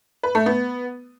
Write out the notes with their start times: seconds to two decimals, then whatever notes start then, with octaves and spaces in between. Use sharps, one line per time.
0.23 B4
0.35 A3
0.46 B3